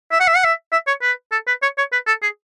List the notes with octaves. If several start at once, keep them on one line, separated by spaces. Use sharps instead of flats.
E5
F#5
E5
F#5
E5
E5
C#5
B4
A4
B4
C#5
C#5
B4
A4
G#4